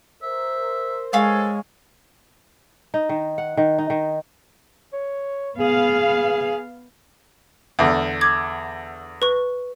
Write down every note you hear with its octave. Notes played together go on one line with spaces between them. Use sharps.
A#4 C5 E5
G#3 A4 C#5 F5 G#5
D#4
D#3
F#5
D#3
D#4
D#3
C#5
B3 G#4 F5
E2 D3
D6 G#6
B4 C#6